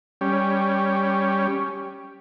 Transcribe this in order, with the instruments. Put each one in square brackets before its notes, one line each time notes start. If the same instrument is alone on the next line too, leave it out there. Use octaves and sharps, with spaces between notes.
[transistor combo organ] G3 C#4